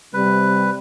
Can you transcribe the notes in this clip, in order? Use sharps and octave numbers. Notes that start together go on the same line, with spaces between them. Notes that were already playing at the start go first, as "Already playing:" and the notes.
C3 G3 B4